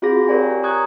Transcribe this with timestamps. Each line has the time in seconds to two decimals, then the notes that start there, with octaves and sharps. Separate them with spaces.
0.02 C4 F4 F#4 G#4 D6 A#6
0.28 G4 A#4 C#5 D5 G#5
0.49 C#5
0.63 A#5 C#6 D#6 F#6 G#6